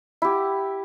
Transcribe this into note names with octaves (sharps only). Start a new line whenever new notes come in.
E4 G4